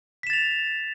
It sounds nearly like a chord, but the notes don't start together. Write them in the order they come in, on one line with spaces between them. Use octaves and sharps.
B6 E7 A6 F7